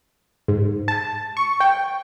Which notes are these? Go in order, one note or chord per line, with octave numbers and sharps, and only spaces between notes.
G#2
A5
C#6
G5